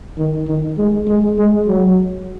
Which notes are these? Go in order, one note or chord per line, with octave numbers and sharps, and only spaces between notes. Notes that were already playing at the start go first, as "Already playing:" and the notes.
D#3
D#3
G#3
G#3
G#3
F#3